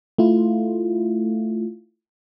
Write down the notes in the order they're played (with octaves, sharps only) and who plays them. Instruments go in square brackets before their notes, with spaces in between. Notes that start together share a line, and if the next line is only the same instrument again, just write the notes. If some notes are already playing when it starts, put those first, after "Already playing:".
[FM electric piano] A3 E4 F4